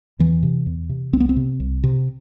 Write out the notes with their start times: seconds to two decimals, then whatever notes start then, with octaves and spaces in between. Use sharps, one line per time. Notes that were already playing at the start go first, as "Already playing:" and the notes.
0.19 E2 E3
0.43 C3
0.66 E2
0.89 C3
1.13 C2 C4
1.20 B3
1.29 C4
1.36 C3
1.60 C2
1.84 C3